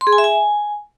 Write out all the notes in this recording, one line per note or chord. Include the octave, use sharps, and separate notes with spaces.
C6
G#4
G#5
E5
G#5